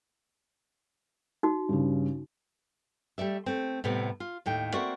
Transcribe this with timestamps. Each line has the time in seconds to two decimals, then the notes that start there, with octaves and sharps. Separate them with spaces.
1.43 D#4 F#4
1.69 G2 C#3
3.18 G3 A3 D5 E5
3.46 A3 C4
3.84 A2 C3 G3 B3 E4
4.20 F4
4.46 D#2 A2 G5
4.73 A3 A#3 C4 F#4 D5 E5